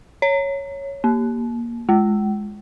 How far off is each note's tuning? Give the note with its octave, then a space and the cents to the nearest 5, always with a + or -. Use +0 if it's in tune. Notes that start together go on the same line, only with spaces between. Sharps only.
C#5 +0
A#3 +15
G#3 +5